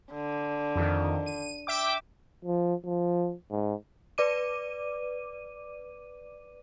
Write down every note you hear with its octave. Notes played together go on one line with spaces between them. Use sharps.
D3
F2 D#3
D#7
E5 G5 D6
F3
F3
G#2
B4 D5 D6 D#7